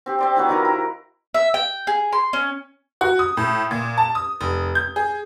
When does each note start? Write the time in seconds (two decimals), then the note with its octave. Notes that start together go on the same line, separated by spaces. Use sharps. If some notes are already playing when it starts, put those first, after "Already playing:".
0.06 C4 G4
0.19 C4 D5 C6
0.35 F#3 B3 E4 D5
0.49 D#3 F4 F#4 A#4
0.65 E4
1.34 E5
1.54 G5
1.87 G#4
2.13 C6
2.33 C#4
3.01 F#4
3.19 D#6
3.37 A2
3.71 A#2
3.98 A5
4.15 D#6
4.41 F1
4.75 G6
4.96 G#4